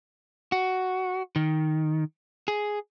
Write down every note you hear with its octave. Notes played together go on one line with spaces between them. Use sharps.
F#4
D#3
G#4